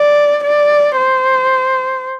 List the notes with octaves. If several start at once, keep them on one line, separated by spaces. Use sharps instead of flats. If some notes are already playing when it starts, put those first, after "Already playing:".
Already playing: D5
D5
C5